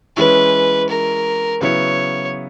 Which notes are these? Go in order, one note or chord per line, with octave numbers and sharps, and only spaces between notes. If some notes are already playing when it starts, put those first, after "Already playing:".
E3 G#3 C#4 E4 B4
A#4
C#3 F#3 B3 E4 C#5